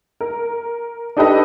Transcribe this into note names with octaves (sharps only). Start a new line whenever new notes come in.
A#4
D4 D#4 G4 A4 B4 D#5